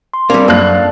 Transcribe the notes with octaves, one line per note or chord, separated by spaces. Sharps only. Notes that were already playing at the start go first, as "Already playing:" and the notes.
C6
G3 A#3 C4 D4 A4
F#2 F3 A#3 F5 F#6